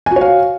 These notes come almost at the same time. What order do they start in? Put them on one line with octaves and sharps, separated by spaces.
G#5 F#4 C#5 F5